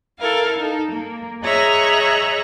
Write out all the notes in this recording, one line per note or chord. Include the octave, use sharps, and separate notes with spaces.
E4 A4 A#4 F5
D#4 A4
A#3
G#4 C#5 D#5 E5 A#5 F#6